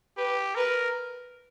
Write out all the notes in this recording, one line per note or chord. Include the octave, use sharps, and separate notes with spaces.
G4 B4
A#4 B4